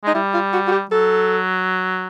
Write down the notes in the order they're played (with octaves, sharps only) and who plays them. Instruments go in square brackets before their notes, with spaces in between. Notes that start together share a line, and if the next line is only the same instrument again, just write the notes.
[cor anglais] G#3 [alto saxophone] D#4
[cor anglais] G3 [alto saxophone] E4
[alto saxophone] F4
F#4
F#4
G4
[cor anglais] F#3 [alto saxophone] A4